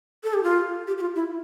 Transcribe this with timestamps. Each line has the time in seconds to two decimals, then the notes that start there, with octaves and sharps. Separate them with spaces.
0.24 A4
0.34 G4
0.43 F4
0.87 G4
0.98 G4
1.01 F4
1.16 E4